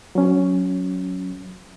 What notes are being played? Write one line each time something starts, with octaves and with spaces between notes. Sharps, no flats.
F#3 C#4